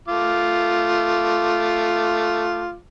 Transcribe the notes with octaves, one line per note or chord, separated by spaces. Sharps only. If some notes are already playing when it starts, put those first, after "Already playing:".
A3 F4 D6